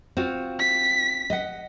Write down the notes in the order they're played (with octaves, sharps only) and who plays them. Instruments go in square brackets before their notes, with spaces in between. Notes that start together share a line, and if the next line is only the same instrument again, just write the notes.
[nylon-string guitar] C4 F4 F#4
[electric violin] B6
[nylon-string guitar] D#5 F#5